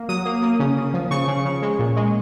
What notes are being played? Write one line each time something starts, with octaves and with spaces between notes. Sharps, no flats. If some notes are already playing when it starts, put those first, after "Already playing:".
Already playing: A#3
F#3 D#6
A#3
A#3
C#3
C#3
F3
C#3 C#6
C#3
C#3
G#3
A#2
G#3